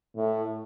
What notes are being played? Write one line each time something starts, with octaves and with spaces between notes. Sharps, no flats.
A2